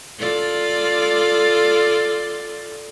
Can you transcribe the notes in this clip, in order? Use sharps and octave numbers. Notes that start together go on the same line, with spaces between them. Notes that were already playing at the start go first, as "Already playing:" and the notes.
F4 A4 D5